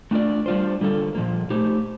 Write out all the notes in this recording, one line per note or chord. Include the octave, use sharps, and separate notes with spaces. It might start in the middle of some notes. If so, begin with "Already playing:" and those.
A3 D4 F4 A#4 D5
G3 D4 F4 C5
D3 G3 A#3 F4 A4
A#2 F3 A#3
A3 D#4 G4 C5